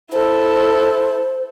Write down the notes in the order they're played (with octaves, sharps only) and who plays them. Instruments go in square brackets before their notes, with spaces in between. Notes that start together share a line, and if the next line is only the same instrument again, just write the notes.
[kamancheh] E4 A4 [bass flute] C5